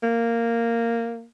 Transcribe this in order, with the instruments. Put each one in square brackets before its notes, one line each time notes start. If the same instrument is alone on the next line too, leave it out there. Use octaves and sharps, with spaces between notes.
[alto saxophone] A#3